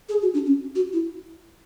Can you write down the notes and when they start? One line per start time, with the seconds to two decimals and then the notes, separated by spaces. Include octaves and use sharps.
0.09 G#4
0.22 F#4
0.34 D4
0.46 C#4
0.75 F#4
0.93 E4